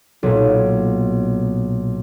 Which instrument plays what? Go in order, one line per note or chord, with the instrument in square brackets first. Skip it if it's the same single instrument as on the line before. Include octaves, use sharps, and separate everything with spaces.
[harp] B1 A#2